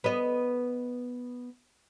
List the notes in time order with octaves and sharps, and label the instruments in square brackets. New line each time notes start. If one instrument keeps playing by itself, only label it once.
[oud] B3 D#5